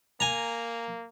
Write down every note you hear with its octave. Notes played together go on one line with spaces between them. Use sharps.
A#3 G#5 A#5